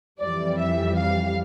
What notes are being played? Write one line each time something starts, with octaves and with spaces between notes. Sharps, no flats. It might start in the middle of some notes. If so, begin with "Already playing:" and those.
F2 E3 G3 D5
E5
F5